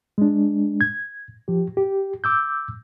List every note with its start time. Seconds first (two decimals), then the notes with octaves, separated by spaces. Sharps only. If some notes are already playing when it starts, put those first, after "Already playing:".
0.18 G#3 D4
0.81 G#6
1.48 F3 G4
1.77 G4
2.24 D6 E6 G6